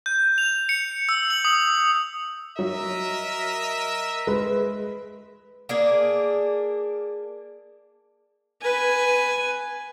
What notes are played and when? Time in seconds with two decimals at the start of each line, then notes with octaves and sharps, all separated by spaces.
0.06 G6
0.38 F7
0.69 C#7
1.09 E6
1.30 F#7
1.45 D#6
2.59 F#3 A#4 D#5 E5
4.27 G#3 B4
5.69 A#3 D4 G#4
8.62 B4 G#5